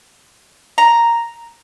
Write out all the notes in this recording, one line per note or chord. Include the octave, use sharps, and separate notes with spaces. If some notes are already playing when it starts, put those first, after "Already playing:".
A#5